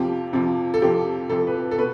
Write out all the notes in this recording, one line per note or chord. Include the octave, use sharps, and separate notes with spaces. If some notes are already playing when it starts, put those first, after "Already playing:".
Already playing: F2 C3 F3 G4
F2 C3 F3
A4
F2 C3 F3 G4
F2 C3 F3 A4
B4
A4
B2 B4